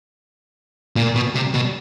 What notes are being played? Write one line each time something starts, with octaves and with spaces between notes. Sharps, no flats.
A#2
B2
C3
B2